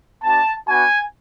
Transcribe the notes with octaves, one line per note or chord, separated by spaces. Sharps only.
B3 D4 F#4 A5
B3 D4 F#4 G#5